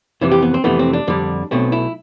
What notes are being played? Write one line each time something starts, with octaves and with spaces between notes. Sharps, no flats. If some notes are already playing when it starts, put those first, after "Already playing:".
F2 C3 E3 E4
G4
B3
C4
F2 C3 E3 A3 B3
C4
D4
F2 D3 G3
B1 B2 A3 C4
E4